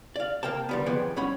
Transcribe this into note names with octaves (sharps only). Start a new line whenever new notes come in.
D5 F5
C3 A#3 A#4 G5 A5
D3 G3 B3
B1 F2 F3 B3 G#4 G5
F2 G3 C#4 F#5 B5